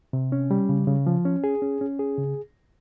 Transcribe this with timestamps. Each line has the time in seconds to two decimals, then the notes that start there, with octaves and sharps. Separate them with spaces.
0.13 C3
0.32 C#4
0.51 G3
0.69 C#3
0.87 C#3
1.07 F3
1.25 C#4
1.44 G#4
1.62 C#4
1.81 C#4
1.99 G#4
2.18 C#3